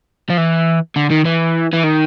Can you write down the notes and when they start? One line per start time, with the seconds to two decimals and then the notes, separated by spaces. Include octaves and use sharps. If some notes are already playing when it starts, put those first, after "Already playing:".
0.30 F3
0.37 E3
0.96 D3
1.11 D#3
1.25 E3
1.73 E3
1.84 D#3